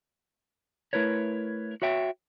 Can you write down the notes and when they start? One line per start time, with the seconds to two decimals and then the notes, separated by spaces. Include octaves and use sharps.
0.93 A3 E4 A#4 B4 C#5
1.82 F#4 C#5 E5 G5